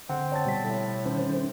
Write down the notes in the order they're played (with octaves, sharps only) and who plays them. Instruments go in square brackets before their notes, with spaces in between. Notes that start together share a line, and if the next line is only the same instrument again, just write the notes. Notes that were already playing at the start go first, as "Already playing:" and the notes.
[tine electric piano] D3 [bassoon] C4 [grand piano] F#5
[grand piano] C#5 A5 A6
[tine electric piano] B2 G3 B6
[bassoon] A2
[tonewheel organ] D#3 C#4 C5